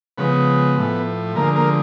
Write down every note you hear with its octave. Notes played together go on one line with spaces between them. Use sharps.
C#3 F3 G#3 B3 B4
A2 F3 A3
D3 F3 G#3 A#3 A#4
A#3 A#4